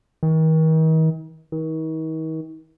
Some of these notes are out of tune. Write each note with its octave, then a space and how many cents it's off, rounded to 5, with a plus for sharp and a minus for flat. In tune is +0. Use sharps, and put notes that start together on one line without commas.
D#3 +40
D#3 +40